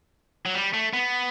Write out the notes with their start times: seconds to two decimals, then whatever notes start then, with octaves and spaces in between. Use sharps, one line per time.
0.46 F#3
0.55 G3
0.74 A3
0.93 B3